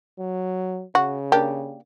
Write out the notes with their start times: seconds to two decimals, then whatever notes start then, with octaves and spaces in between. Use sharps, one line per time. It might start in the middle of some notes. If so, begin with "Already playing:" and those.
0.19 F#3
0.95 C#3 F#4
1.32 A#3 D4 G4